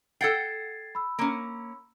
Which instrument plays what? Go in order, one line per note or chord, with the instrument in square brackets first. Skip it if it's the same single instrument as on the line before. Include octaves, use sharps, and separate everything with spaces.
[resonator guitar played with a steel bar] A4 F#5 G5 [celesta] G#6 A6 C7
[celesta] B5 E6
[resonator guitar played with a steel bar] A#3 C#4